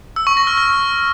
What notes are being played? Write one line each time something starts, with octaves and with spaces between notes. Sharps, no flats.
E6
C#6
A#6
F6
F6